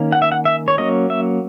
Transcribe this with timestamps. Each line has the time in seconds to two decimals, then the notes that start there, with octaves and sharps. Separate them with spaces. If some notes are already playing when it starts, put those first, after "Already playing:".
Already playing: D#3 A#3 C#4
0.12 F#5
0.22 E5
0.32 F#5
0.45 E5
0.68 C#5
0.78 F#3 A#3 C#4 D#5
1.10 E5